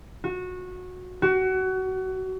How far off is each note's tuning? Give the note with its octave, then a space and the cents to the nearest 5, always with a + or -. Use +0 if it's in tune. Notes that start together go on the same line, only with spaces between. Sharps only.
F#4 -20
F#4 +25